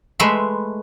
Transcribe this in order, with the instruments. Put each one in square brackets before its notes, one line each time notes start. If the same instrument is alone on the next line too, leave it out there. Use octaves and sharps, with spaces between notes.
[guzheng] G#3 A3 B4 E5 B5 C6